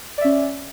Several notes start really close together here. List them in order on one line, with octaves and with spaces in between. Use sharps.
D5 E5 C#4